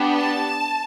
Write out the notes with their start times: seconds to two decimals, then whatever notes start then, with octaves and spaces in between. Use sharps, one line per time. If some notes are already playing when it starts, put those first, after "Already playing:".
Already playing: B3 D4 G4
0.17 A5